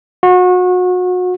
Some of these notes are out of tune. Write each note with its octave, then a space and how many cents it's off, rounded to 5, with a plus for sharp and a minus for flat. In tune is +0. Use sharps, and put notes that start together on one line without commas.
F#4 -30